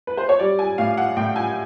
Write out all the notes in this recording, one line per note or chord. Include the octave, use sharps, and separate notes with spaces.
B4
C5
C#5
G3 D5
G#5
A2 F5
F#5
A2 G5
G#5